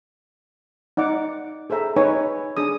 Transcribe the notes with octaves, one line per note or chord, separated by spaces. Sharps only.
D#4 D5 F#5 D6
G#4 A4 C5 E5 A#5
D#4 B4 C#5 G#5
D4 G#4 D#6